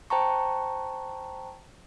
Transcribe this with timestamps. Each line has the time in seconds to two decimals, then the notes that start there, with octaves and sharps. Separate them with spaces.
0.10 C5 G5 A5 A#5 C#6